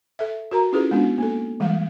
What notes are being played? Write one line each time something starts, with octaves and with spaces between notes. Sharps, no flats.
A4 E5
F#4 A#4 A#5
C#4 E4 F4 G#4 A4 B4
G#3 B3 D4 F#4
A#3 A4
E3 G3 G#3 F5